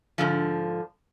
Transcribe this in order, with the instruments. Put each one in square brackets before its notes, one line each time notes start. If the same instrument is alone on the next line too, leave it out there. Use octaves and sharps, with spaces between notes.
[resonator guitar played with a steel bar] G#2 D3 F3